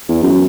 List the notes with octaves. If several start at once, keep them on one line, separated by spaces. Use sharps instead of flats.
E2
F#2